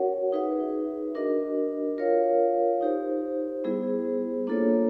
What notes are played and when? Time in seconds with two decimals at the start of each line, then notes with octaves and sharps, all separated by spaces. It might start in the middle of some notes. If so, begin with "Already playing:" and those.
Already playing: C#4 F#4 A#4 C#5 F#5
0.32 D#4 G#4 B4 E5
1.15 D4 F#4 A#4 D#5
1.98 F4 A#4 C#5 F5
2.81 D#4 G4 C5
3.64 G3 B3 E4 G#4 C5
4.47 A#3 D4 F4 A4 C#5